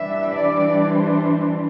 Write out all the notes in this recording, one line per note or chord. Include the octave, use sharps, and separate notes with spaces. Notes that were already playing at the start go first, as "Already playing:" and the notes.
Already playing: E3 G3 D4 E5
D5
C5